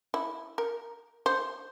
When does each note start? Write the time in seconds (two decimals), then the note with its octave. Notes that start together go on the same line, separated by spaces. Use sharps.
0.14 E4
0.58 A#4
1.26 C5